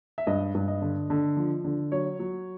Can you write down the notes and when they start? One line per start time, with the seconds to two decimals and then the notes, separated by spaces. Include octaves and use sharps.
0.18 E5
0.27 G2 D#5
0.55 G2
0.68 D#5
0.82 D3
1.10 D3
1.37 F3
1.64 D3
1.92 F#3 C#5
2.19 F#3